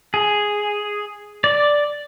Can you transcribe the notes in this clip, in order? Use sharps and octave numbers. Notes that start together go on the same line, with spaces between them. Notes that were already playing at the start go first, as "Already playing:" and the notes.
G#4
D5